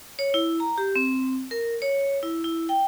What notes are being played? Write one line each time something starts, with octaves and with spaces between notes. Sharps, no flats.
C#5
E4
A#5
G4
C4
A#4
C#5
E4
E4
G5